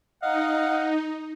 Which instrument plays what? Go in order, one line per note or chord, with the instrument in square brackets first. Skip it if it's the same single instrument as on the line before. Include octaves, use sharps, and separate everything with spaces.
[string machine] D#4 [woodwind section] D#5 F5 F#5